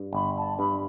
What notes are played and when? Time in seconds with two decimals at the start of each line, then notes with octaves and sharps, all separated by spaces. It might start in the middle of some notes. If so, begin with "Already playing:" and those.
Already playing: G2
0.13 G1 B5
0.36 A5
0.59 G2 B5